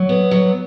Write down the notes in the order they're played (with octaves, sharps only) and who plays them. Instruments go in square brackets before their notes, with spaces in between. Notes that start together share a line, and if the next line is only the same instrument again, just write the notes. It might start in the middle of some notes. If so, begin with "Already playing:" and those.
Already playing: [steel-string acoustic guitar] F#3
B3
F#3